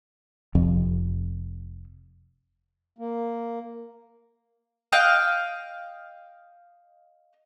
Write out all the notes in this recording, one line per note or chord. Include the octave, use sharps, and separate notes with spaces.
F1 F2
A#3
D#5 F5 G5 F#6